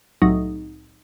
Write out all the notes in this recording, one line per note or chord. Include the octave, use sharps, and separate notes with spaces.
C2 A2 F#3 D#4